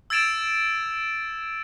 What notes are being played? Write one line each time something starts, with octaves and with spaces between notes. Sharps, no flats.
E6 G#6 A6 D7 E7 F7